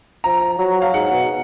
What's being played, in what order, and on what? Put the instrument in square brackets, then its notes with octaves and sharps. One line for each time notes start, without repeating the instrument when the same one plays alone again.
[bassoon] F3 [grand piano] A#5
[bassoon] F#3
[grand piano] F5
[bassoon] G#2 [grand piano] F#5
[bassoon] B2